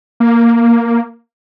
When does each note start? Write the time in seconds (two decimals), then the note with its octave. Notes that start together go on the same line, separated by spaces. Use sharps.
0.20 A#3